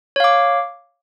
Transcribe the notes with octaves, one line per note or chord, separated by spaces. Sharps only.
C#5 F5 D6